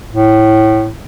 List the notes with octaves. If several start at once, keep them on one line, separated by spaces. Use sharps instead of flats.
A2